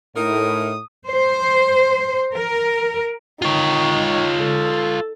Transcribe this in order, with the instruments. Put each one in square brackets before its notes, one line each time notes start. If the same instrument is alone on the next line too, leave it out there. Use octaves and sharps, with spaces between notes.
[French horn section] A2 [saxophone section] D#4 A#4 [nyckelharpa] D#6
[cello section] C5
A#4
[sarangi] D#3 [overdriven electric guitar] F4 C#5
[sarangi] A4